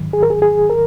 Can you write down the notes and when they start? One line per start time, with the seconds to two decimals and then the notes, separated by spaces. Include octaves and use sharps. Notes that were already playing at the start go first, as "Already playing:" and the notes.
Already playing: G#2 D#3 F#3
0.13 G#4
0.23 A#4
0.30 G#4
0.42 G#4
0.70 A#4